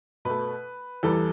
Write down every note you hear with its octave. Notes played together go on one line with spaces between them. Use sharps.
B2 A3 B4
E2 E3 G3 A4